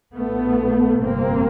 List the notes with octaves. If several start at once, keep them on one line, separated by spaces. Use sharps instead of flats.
A#1 A2 A3 B3
G1 F2 C3 A#3 C4